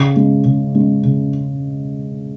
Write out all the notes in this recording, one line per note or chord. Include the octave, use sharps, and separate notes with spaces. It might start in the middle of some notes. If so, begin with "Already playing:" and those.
Already playing: C#3
G#3 C#4
C#3
G#3 C#4
C#3